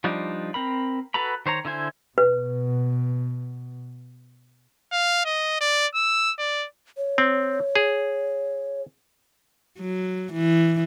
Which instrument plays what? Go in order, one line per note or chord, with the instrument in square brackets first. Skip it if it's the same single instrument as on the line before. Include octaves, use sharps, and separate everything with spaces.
[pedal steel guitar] F3 G3 D4 D#4 F4
C4 A#4 B5
F#4 A4 B4 A#5 B5
D#3 C5 C#5 A#5
D3 E4 C5 G#5
[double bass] B2 [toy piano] B4
[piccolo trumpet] F5
D#5
D5
E6
D5
[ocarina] C#5
[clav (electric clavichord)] C4
G#4
[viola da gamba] F#3
E3